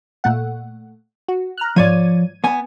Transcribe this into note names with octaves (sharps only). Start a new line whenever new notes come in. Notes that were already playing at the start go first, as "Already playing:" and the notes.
A#2 A3 F#5
F#4
A#5 F6 F#6
G#2 F3 C#5 D5 G#6 D#7
B3 G#5